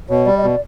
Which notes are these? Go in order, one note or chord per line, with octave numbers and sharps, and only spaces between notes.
B2 C#5
G3 D5
D#5
B2 D5